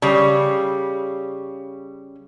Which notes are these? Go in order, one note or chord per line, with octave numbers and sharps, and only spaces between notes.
C#3 G3